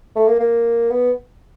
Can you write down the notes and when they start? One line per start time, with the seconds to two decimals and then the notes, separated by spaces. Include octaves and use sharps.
0.16 A3
0.28 A#3
0.40 A#3
0.90 B3